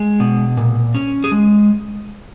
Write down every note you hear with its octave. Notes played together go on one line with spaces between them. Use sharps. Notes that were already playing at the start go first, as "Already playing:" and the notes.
Already playing: G#3 G#4
B2
A#2
C#4
G#4
G#3